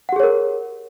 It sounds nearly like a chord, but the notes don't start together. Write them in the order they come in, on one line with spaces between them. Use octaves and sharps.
F#5 G4 G#4 C#5 A#4